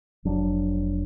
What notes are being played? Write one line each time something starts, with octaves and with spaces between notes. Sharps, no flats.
F1 F#3 D4